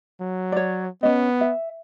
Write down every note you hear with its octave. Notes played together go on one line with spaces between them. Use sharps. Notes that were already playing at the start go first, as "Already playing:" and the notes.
F#3
C#5 D5
B3 C#4 D#5
E5